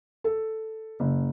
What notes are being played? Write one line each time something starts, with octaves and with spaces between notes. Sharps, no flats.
A4
F#1